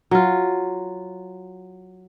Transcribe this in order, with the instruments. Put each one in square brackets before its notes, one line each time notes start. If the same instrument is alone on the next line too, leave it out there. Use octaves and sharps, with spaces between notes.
[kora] F#3 F4